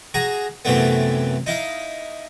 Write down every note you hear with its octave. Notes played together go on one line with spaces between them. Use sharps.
F#4 G#4 A#5
F#2 C3 E3 F#3 A3 B3
D#4 E4 F5